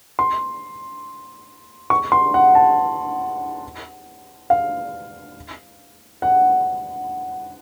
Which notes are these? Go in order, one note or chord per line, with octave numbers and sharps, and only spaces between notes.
C6
C#6
C6
F#5
A5
F5
F#5